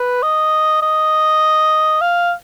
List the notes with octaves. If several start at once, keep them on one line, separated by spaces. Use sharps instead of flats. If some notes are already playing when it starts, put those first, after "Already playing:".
Already playing: B4
D#5
D#5
F5